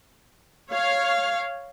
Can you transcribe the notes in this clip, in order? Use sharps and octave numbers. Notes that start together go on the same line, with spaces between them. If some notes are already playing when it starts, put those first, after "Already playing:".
C#5 F5